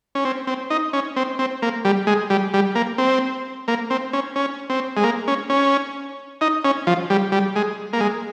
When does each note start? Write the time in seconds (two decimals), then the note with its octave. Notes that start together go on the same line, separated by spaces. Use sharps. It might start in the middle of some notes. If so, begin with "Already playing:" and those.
0.15 C#4
0.25 C4
0.47 C4
0.70 D#4
0.93 C#4
1.16 C4
1.39 C4
1.62 A#3
1.85 G3
2.07 G#3
2.30 G3
2.54 G3
2.75 A#3
2.98 C4
3.68 A#3
3.90 C4
4.13 C#4
4.36 C#4
4.70 C4
4.97 G#3
5.04 A#3
5.28 C#4
5.50 C#4
6.41 D#4
6.65 C#4
6.87 F3
7.10 G3
7.32 G3
7.56 G#3
7.93 A#3
8.01 G#3